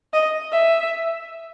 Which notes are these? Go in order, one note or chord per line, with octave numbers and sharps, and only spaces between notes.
D#5
E5